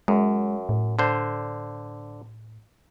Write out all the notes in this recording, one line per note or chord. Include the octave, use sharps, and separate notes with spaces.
F#2 G#3
A2
D3 C5